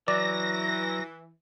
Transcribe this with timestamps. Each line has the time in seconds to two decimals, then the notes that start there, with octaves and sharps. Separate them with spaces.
0.08 E3 F#3 D5 A#6